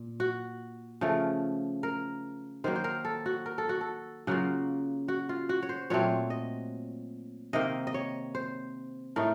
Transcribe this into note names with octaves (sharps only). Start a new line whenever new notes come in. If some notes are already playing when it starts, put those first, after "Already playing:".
Already playing: A#2
F#4
C#3 F3 A3
A#4
D#3 F#3 A#3 C5
C5
A#4
A4
F#4
A#4
A4
F#4
A4
C#3 F#3 A#3 F4 F#4
F#4
F4
F#4
C#5
C5
A#2 F#3 A3 C4 C#5
D#5
C3 D#3 A#3 D#5
D#5
C#5
C5
A2 A3 D#4 A#4